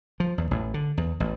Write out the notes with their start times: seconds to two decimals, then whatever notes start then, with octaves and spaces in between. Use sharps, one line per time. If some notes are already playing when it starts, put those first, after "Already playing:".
0.20 F3
0.38 E2
0.51 A1
0.74 D3
0.97 E2
1.20 A1